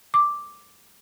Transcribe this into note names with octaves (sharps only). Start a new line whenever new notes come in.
D6